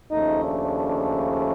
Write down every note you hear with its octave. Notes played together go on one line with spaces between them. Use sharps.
D#2 C#3 F3 A3 D#4
D4